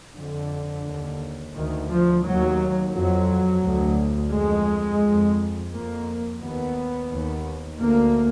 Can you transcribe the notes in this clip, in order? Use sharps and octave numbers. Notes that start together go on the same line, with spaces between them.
F2 D3
D#2
D2 D#3
F3
D#2 F#3
F2 F#3
D2
F2 G#3
F2
F2 A#3
D#2 B3
D#2
D2 A#3